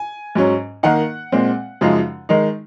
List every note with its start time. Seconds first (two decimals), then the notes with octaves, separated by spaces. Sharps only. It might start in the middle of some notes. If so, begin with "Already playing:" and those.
Already playing: G#5
0.35 G#2 F#3 C#4
0.83 D#3 A#3 D#4 F#5
1.32 A#2 G#3 C4
1.81 F#2 C#3 F3 G#3 D#4
2.29 D#3 G#3 D#4